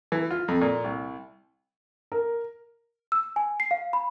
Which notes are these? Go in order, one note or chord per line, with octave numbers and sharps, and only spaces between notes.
E3
F4
F2
A#2
C2
A#4
E6
G#5
C7
F5
B5